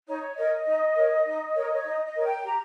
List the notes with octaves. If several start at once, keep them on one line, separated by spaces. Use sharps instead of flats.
D#4 C#5
A#4 C#5 D#5
D#4
A#4 C#5
D#4
A#4 C#5
C#5
D#4 D#5
D#5
A#4 C#5
G5
G4 A#5